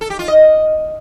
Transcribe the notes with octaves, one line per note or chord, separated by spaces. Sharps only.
A4
G4
F4
D#5